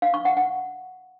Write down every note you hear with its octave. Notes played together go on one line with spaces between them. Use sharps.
F5
C#6
F#5
F#5